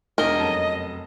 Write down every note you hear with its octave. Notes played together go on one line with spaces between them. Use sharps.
E1 D4 A#4 D#5 G7
F1 F#2 A5